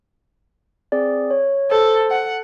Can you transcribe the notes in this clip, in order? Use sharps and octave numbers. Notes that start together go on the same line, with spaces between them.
C4 G#4 D5
C#5
A4 C5
F#5